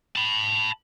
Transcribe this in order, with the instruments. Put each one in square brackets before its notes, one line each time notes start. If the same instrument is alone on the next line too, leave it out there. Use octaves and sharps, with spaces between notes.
[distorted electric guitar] A5 B5